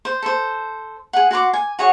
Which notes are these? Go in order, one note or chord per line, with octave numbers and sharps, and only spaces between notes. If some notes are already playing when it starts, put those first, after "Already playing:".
C5
A4 C5
G#4 F#5
F#4 F#5 C6 D6
G#5
F#4 G#4 C#5 F#5